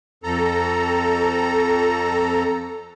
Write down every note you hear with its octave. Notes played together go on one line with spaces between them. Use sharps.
F2 A4 A#5